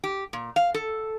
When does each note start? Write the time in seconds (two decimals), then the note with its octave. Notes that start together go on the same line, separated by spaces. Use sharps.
0.04 G4
0.33 A#2
0.56 F5
0.74 A4